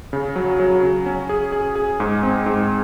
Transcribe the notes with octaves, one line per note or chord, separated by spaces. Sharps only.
C#3
F#3
F#3
C#3
C#4
G#4
G#4
G#4
G#2
C4
G#2